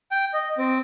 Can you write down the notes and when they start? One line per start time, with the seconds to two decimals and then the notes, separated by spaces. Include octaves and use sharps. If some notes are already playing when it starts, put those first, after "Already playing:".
0.11 G5
0.33 D#5
0.58 C4